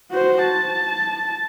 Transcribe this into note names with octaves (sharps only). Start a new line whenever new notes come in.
F#4 C5
A5